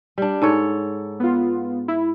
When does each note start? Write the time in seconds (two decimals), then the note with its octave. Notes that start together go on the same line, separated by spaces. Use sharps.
0.18 G3 D4
0.42 G#2 A4 C#5
1.20 B3 F4
1.88 E4